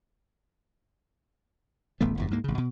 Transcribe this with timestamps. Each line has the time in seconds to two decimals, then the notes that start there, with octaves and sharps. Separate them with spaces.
2.01 D1 A1 A3 B3
2.18 F#1 E2 G2
2.31 D2 G#2 A#3
2.44 A1 C#3
2.58 B2